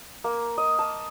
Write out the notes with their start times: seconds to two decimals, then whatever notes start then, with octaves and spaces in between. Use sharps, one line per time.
0.24 A#3
0.58 D#5
0.79 A5